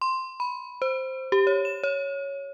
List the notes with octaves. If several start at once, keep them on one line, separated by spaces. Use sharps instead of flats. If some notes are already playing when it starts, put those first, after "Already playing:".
C6
B5
C5
G4
C#5
E7
C#5